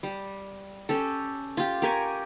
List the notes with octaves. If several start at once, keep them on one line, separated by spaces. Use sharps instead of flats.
G3
C#4 G4 A4
F4 G4
G4 A#4 G#5 C#6